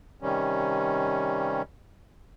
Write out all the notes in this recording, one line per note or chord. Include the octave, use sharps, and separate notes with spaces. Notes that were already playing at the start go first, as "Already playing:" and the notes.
C3 D#3 G3 C#4